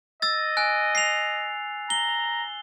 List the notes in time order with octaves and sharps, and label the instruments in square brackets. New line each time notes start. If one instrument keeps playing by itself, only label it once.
[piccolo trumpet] D#5 [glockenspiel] E6 A6
[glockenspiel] G#5 F#6
C7 F7
[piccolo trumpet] A#5 [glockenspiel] G7